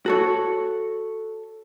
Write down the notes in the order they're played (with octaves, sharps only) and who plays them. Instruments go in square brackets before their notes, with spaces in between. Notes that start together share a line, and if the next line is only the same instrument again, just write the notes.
[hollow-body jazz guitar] F#4 A4 C#5